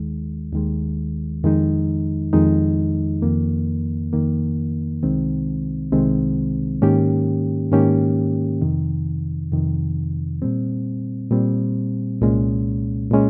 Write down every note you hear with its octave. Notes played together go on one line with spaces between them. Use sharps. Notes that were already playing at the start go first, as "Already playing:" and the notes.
Already playing: D#2 D#3 G#3
D#2 D#3 G#3
F2 D#3 G#3 D#4
F2 D#3 G#3 D#4
F2 D#3 A#3
F2 D#3 A#3
C2 C3 D#3 G#3 C4
C2 C3 D#3 G#3 C4
G#2 D#3 A#3 C#4 G4
G#2 D#3 A#3 C#4 G4
F2 C3 D#3
F2 C3 D#3
A#2 G3 C4
A#2 G3 C4
C2 A#2 G#3 C#4
A#2 G#3 C#4